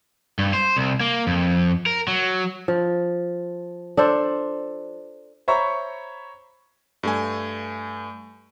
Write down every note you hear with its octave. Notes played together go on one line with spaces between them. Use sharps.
G2
C5
C2
A#3
F2
A#4
F#3
F3
D4 A4 C5
C5 C#5 E5 A#5 B5 C#6
G2 A3 G#5